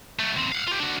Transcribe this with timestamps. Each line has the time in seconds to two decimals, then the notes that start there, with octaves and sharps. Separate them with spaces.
0.19 F#3 A3
0.37 D#2 C4
0.52 F5 F#5
0.68 F4 G4
0.80 D4 F#4